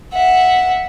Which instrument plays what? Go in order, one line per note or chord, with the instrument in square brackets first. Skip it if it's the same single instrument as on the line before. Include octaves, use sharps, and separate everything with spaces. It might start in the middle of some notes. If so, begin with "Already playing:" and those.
[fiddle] E5 F#5